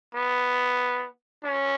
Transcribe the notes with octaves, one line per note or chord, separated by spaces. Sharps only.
B3
C#4